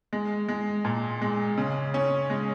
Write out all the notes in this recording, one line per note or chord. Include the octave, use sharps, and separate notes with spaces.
G#3
G#3
A#2
G#3
C#3
C#4
G#3